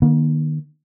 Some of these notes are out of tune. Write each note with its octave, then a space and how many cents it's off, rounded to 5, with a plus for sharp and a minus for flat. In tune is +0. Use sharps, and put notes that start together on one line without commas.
D#3 -30 A#3 +40